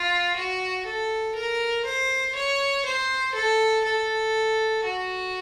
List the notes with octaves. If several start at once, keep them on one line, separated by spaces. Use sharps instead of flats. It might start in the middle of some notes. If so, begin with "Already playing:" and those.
Already playing: F4
F#4
A4
A#4
C5
C#5
C5
A4
A4
F#4